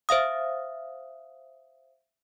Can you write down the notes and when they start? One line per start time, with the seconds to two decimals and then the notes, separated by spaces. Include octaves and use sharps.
0.09 C5 E5 F5 D#6